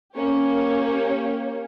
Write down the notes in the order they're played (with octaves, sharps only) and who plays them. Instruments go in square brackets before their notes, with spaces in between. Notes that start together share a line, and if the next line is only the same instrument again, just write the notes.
[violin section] A#3 C#4 G4 C#5